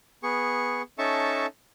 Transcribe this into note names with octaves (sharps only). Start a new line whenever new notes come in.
B3 G#4 C#6
C#4 D#4 A4 E5 A5 C#6